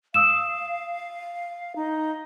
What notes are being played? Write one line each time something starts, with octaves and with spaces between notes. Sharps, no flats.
F5 D#6 E6 E7
D#4